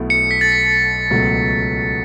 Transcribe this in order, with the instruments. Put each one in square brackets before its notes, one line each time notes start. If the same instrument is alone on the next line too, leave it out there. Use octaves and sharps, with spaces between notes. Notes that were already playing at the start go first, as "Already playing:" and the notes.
Already playing: [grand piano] B1 B2 A3 E4
[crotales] C#7
B6
A6
B6
[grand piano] C#2 B2 F#3 A3